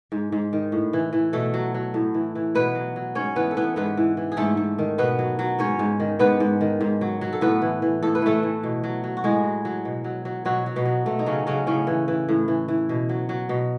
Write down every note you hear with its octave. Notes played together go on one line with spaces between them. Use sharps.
G#2
G#2
D#3
A2
E3
E3
B2 A3 A4
F#3
F#3
A2
E3
E3
B2 B3 B4
F#3
F#3
G#2 C#4 C#5
E3 B3 B4
A4
E3 B3 B4
G#2 B3 B4
E3
E3
G#4
G#2 A3 A4
G#2
D#3
B2 B3 B4
F#3
F#3
G#2 C#4 C#5
G#2
D#3
G#2 B3 B4
G#2
D#3
G#2
F#3
F#3
A4
A2 B3 B4
E3
E3
A2 A4
B4
E3 A3 A4
E3
B2
F#3
F#3
F#4
A2 G#3 G#4
F#3
F#3
B2
F#3
F#3
B2 F#3 F#4
F#3
B2 B3
F#3
B2 A3
D#4
C#3 F#3 C#4
C#3 F#3 C#4
A2 C#3 C#4
E3
E3
A2
E3
E3
B2
F#3
F#3
B2